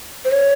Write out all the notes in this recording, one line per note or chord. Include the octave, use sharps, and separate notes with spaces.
C5
C#5